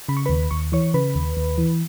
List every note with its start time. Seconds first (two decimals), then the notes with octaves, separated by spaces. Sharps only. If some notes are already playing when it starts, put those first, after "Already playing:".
0.09 C#3 B5
0.17 C#6
0.26 D#2 B4 B5
0.51 D#2 C#6
0.72 E3 C#5 C#6
0.94 C#3 B4 B5
1.15 D#2
1.37 D#2
1.58 E3